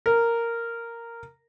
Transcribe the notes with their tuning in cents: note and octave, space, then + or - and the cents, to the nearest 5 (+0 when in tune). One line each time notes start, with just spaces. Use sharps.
A#4 -5